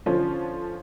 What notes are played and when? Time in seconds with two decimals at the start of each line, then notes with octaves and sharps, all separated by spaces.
0.06 D3 F3 C#4 F4 C5